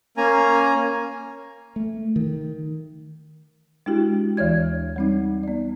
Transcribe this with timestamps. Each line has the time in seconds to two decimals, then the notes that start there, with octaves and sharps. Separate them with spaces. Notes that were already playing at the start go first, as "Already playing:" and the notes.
0.17 A#3 C#4 G#5 A#5
1.76 A3
2.16 D#3
3.86 G#3 D4 E4 F#4 G4
4.37 D#2 E3 C#5 D5 G#6
4.96 G3 C4 D#4
5.43 B3 D5